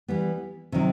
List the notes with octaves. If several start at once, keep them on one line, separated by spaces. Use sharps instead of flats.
E3 G3 B3
C3 D#3 F#3